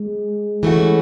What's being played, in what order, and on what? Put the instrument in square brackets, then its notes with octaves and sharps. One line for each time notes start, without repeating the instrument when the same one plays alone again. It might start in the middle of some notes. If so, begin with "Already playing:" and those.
Already playing: [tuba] G#3
[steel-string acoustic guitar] E3 A3 C#4 F#4